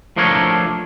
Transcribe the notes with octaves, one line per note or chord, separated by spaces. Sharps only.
F3 A3 D4 A#4 C#5